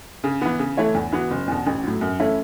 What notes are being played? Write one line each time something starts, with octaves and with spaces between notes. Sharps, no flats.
C#3
E3 B3
C#3
E3 A3 E4 C#5
E2
E3 B3 F#4
F#1
E2 B2
A1
A2 F#3
F#2
E3 A3 C#4 E4